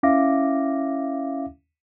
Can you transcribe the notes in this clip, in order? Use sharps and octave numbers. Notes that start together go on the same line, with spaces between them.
C#4 E4 E5 F5 D6 A#6